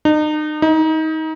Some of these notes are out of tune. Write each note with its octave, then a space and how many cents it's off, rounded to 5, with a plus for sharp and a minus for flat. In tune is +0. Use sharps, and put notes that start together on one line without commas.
D#4 -35
D#4 +25